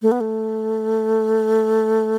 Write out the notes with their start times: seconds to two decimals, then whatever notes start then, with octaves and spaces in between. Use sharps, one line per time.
0.02 A3
0.12 B3
0.21 A3